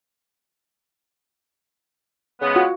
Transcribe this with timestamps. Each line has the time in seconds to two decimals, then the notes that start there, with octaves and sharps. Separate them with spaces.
2.42 C#3 G#3 B3
2.56 F4 F#4